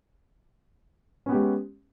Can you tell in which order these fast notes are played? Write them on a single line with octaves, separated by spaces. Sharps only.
C#4 B3 G4 G#3